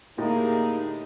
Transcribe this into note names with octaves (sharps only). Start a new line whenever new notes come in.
A2 D3 A#3 D#4 G4 G#4